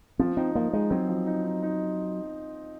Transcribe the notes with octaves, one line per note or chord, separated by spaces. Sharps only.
F3 C4
C4 D#4
F3 A#3
G#3 D#4
F#3 C4
F3
D#4
D#4
D#4